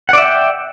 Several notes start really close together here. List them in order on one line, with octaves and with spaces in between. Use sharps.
F#5 D5 E5 G5